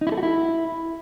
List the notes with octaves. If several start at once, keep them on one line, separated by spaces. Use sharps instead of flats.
D#4
E4
A4
F#4
E4